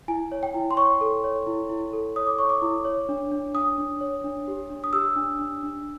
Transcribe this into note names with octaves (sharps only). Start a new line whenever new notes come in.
E4 G#5
C#5
G5
E4
C6
C#5 C#6
A4
C#5
E4
E4
A4
C#5 D#6
D6
C#5 C#6
D6
E4
C#5
D4
D4
D4 D#6
D4
C#5
D4
G4
D4
D#6
G4 E6
D4
D4
D4